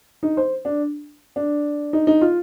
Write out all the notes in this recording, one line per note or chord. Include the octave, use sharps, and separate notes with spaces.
D#4
C5
D4
D4
D#4
D#4
F4